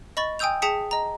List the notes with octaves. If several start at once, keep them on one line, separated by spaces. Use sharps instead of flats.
D#5 B5 C#6 A6
G5 G#5 D#6 E6 G6 F7
G#4 G5 A5 D#6 B6 C#7
D#5 A#5